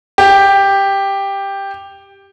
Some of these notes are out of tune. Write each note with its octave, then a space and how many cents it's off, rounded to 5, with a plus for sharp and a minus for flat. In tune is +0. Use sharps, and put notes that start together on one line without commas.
G4 +5